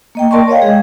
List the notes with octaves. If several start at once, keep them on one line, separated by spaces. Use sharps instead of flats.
A#3 D#5 G5
A#4 D5 A5 C6 C#6
C#5 D#5 F5 G5
G#3 G#4